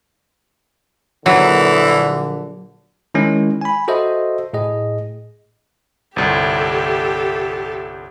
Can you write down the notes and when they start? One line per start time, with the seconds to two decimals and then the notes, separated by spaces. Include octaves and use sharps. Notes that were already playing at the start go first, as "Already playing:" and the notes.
1.26 A#1 D3 E3 F#3
3.14 D#3 G#3 C#4 E4
3.61 G#5 B5
3.88 F#4 A4 C5 D#5 E5
4.53 A2 G#4 D#5
6.16 G1 C2 G4 A4